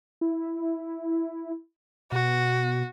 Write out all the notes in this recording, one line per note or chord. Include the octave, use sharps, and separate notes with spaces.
E4
B2 F#4